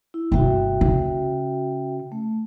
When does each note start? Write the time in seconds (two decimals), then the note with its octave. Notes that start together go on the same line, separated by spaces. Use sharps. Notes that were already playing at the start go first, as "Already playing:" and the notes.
0.14 E4
0.32 G1 C3 F#4 E5 G5
0.81 C#3
2.12 A3